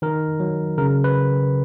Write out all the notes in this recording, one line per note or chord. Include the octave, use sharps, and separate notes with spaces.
D#3 A#4
F#3
C#3 A#4
B4